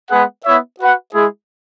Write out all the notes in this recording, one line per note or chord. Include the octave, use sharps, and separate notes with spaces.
G#3 B3 G#4 B4 F#5
B3 E4 C#5 E5
F#4 B4 F#5
G#3 E4 G#4